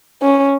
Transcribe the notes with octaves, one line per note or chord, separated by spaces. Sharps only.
C#4